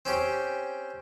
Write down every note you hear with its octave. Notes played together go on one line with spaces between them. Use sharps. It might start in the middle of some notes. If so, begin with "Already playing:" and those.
C4 C#4 G4